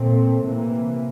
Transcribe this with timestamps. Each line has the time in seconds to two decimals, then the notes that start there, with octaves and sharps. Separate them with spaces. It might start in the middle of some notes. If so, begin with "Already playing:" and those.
Already playing: A#2 A3 C4
0.41 C3 E3 A#3